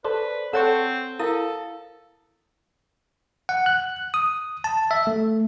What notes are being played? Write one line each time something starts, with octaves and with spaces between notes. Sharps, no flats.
A4 B4 C5 D5
C4 A4 C5 C#5 F#5 A5 C#6
E4 A4 A#4 F5 D#6
F#5
F#6
D#6
A5
E5
A3